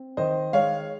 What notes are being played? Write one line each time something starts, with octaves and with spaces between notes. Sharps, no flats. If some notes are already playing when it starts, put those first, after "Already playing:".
Already playing: C4
D#3 C5 D#5
G#3 C#5 F5